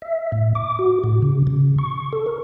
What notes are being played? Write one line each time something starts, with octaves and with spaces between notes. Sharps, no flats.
E5
A2
D6
F#4
A2
C#3
C#3
C#6
A4
A#4